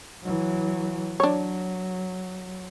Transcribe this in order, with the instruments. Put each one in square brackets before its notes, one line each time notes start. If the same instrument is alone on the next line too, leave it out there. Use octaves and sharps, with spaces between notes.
[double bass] E3 F#3
[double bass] F#3 [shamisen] D4 C#5